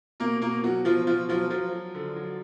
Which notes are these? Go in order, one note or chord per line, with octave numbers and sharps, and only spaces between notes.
B2 A#3 A#4
B2 A#3 A#4
B2 F#3 F#4
B2 F3 F4
B2 F3 F4
F3 F#3 F4
F3 F#3 F4
F#3
D3
F#3